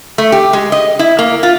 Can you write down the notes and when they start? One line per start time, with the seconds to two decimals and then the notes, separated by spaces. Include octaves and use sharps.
0.18 A3
0.32 G4
0.53 G#3
0.72 D#5
0.99 E4
1.19 A#3
1.43 F4